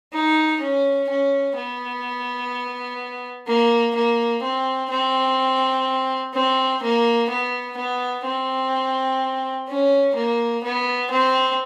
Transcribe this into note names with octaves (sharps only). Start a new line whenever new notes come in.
D#4
C#4
C#4
B3
A#3
A#3
C4
C4
C4
A#3
B3
B3
C4
C#4
A#3
B3
C4